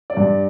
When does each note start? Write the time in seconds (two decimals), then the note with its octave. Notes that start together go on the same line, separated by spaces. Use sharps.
0.10 D5
0.17 G2